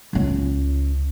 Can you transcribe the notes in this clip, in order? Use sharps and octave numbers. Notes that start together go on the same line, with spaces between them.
C#2 C#4